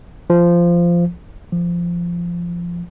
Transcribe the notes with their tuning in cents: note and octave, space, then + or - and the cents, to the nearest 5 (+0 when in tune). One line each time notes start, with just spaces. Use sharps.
F3 -15
F3 -15